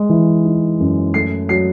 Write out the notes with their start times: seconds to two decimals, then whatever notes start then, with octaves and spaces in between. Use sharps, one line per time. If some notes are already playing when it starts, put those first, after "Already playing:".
Already playing: G#3
0.09 E3
0.45 D#4
0.80 F#2
1.14 A3 C7
1.49 F#3 C7